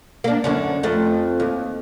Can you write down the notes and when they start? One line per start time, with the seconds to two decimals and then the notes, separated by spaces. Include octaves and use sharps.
0.24 A#3 D4
0.44 F#2 D3 C#4
0.83 F2 A3
1.40 D#2